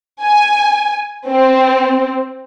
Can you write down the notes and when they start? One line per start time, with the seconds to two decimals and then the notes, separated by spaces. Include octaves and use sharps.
0.22 G#5
1.28 C4